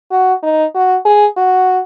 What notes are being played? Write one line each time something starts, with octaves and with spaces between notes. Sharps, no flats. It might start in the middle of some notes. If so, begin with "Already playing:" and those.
F#4
D#4
F#4
G#4
F#4